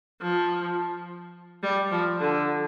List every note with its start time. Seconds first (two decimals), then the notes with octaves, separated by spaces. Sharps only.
0.21 F3
1.63 G3
1.91 F3
2.20 D3